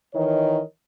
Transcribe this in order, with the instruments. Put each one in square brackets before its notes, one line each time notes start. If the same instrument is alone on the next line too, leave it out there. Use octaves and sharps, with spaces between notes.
[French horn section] D#3 E3 A#4 C#5 D#5